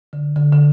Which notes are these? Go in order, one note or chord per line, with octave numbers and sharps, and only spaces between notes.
D3
D3
D3